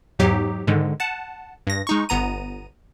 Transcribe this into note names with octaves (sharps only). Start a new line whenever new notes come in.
E2 G#2 F#3 D#4 G4
G#2 D3 D#3 G#3
F#5 A5
G2 A#6
G#3 D#4 C#6
G1 B3 A#5 D#7